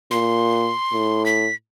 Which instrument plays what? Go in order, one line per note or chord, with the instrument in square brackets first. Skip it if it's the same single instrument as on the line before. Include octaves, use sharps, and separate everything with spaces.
[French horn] A#2 [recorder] C6
[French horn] A2
[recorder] B6